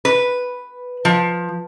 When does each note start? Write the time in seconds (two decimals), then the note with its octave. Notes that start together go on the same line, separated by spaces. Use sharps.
0.05 B4
1.05 F3